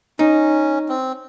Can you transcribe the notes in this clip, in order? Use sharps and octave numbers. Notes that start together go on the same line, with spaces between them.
C#4 D#4
C4